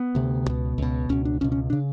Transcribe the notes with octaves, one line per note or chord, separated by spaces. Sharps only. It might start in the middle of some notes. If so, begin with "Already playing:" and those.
Already playing: B3
D2 C3
C#2 B2
C#2 B2
C#2 B2 C#4
D4
C#2 B2 C#4
C#4
C#3 D4